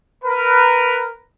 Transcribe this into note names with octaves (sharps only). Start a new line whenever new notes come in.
A#4 B4